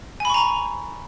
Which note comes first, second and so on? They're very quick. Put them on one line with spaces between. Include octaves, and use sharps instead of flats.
G#5 B5 C#6 A#5